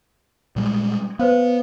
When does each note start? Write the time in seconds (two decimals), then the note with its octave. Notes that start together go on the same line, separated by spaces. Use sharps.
0.56 A#2 G3 G#3
1.19 B3 B4 C5 F5